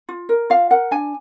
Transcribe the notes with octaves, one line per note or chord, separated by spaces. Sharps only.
F4
A#4
F4 F5
A#4 F#5
D4 G#5